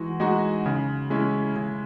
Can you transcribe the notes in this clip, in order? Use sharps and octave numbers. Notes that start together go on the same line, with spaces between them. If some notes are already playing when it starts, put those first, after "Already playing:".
Already playing: E3 G#3 D#4 F#4
G#3 D#4 F#4
C#3
G#3 C#4 E4
C#3